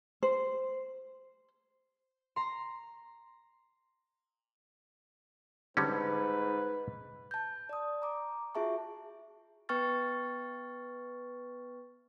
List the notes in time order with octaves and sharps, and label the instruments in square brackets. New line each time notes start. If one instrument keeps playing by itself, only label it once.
[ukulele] C5
[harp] A#5 C6
[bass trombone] G#2 [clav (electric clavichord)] D3 G3 C#4 [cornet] B4
[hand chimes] A5 G6
D5 D#6
A#5 D6
F4 F#4 G#4 E5 A5 C#6
B3 B4 G5 C#6 F6 A6